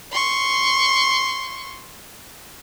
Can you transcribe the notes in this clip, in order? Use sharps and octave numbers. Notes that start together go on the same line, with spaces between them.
C6 C#6